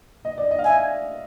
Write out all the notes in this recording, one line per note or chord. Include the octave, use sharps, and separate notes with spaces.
D#5
D5
D#5
F5
E5 G#5